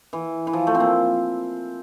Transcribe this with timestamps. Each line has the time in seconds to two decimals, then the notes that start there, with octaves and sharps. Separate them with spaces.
0.13 E3
0.47 E3
0.53 F3
0.67 A3
0.75 C4
0.80 A#3